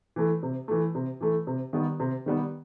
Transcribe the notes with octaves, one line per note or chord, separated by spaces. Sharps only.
E3 A3
C3
E3 A3
C3
E3 A3
C3
D#3 G3 B3
C3
D#3 G3 B3